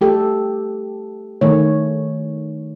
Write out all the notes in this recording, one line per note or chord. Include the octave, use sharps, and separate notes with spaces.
A3 G4 A4
D#3 A3 C#5